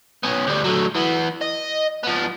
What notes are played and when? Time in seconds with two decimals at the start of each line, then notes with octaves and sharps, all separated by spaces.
0.23 B3 C#4
0.47 D2 G3
0.64 F#3 A3
0.95 E3 B3
1.41 D#5
2.03 F3 B3